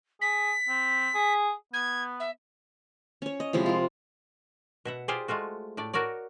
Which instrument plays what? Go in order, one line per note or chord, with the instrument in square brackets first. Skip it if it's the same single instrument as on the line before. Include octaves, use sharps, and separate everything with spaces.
[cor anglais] G#4 [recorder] B6
[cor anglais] C4
G#4
[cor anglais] B3 [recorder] G#6
[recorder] E5
[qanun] C#4 C#5
D#5
C3 F3 G#3 E4
F4 A#4
[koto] B2 E5 F#5
F4 G4 G#4 C5 D5
G#3 A3 F4 F#4
A2 A3 D5
F#4 A#4 C#5 D5